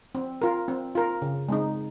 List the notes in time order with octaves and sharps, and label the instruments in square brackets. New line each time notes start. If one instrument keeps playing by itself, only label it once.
[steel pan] C4
F4 A#4
C4
F4 A#4
C#3
G#3 C4 D#4